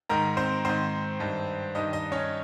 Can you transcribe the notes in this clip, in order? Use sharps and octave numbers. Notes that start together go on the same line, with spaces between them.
G#2 D#3 A#4 A#5
C4 C5
G#2 D#3 C4 C5
G2 D#3
G2 D#3 D#4 D#5
D#4 D#5
C#4 C#5